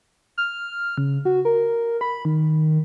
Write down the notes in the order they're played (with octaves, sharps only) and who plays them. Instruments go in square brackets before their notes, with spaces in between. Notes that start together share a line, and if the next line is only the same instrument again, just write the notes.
[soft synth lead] F6
C#3
F#4
A#4
B5
D#3